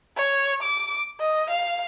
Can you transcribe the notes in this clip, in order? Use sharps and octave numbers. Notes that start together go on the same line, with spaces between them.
C#5
D6
D#5
F5